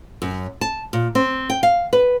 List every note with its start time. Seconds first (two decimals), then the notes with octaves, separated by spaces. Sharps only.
0.22 F#2
0.61 A5
0.93 A#2
1.15 C4
1.50 G5
1.63 F5
1.93 B4